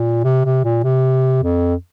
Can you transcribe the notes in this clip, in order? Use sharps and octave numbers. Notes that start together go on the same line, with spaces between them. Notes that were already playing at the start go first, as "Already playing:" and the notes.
Already playing: A#2
C3
C3
A#2
C3
F2